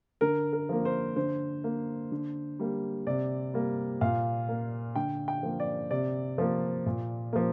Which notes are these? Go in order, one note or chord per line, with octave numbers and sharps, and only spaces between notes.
D3 A#4
A#4
F3 A#3
C5
D3 C5
A#3
D3
G3 A#3
C3 D5
G3 A#3
A#2 F5
A#3
D3 G5
G5
F3 A#3
D5
C3 D5
F3 A#3
A#2
F3 A#3